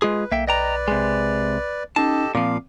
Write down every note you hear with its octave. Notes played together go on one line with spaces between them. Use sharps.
G#3 F4 G#4 B4
B1 A#3 E5 G5
B4 D5 D#5 G5 A#5
C3 G#3
C#4 D#4 G4 A4 D#5 A5
A#2 F3 C4 F5 D6